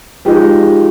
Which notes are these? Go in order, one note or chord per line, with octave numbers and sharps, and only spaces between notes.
F3 G#3 D#4 G4